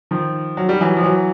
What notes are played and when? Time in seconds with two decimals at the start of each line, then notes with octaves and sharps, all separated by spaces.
0.11 D#3 F3
0.57 F#3
0.69 G3
0.81 E3 F#3
0.97 F3
1.03 E3 F#3